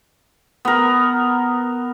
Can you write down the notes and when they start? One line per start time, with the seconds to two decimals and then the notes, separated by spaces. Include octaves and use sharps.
0.65 B3 A#4